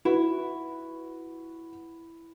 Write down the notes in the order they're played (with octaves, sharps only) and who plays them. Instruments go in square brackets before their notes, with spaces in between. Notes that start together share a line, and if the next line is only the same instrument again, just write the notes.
[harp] E4 [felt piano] F#4 B4